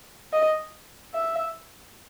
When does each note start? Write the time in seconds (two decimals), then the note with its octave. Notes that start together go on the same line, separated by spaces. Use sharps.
0.33 D#5
1.14 E5